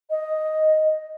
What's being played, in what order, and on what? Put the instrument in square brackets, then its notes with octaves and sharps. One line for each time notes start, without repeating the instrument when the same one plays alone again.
[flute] D#5